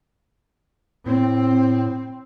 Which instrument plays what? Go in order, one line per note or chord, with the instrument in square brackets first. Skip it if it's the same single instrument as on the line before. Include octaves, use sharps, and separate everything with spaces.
[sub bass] A2 [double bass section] C4